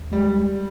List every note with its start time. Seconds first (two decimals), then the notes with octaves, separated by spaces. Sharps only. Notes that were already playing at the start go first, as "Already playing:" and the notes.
Already playing: D#2
0.12 G3 G#3